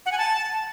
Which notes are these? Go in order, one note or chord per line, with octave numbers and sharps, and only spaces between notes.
F#5
G#5
A5